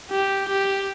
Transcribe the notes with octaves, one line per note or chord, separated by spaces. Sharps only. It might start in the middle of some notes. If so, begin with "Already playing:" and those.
G4
G4